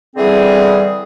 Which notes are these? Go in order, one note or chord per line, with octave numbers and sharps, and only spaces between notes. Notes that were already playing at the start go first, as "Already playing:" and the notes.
D3 E3 G3 C4 G#4